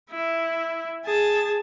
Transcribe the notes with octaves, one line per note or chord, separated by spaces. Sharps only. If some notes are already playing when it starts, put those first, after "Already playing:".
E4
G#4 A5